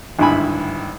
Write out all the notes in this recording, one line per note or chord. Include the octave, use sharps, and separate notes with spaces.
G#1 D2 G2 E4 G#5 B5